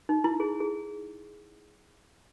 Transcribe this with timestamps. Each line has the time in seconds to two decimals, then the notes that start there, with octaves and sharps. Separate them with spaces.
0.09 D#4
0.24 E4
0.40 G#4
0.60 G#4